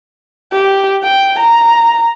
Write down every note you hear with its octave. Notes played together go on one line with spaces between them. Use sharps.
G4
G5
A#5